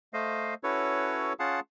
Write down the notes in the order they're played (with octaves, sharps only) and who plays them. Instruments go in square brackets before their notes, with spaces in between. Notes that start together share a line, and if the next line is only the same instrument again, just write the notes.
[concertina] A3 C5 D#5 F5
C#4 E4 F#4 A4 B4 C#5
C#4 F4 G#4 F5 F#5 A5